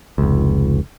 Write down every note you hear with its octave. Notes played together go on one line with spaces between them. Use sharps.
F1 C#2